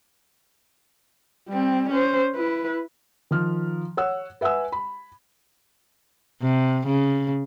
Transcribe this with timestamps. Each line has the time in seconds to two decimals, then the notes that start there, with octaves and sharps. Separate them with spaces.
1.48 G3 C4
1.90 C#4 C5
2.35 E4 B4
3.31 D#3 F3 F6
3.97 C#5 F#5 E6
4.41 B4 E5 F#5 G#5 E6
4.72 B5
6.42 C3
6.87 C#3